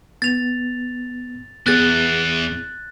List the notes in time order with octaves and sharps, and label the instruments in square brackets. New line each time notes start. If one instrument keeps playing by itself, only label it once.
[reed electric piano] B3 [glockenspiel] A6 F7
[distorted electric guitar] E2 [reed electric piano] B3 G#4 [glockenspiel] F#6 A6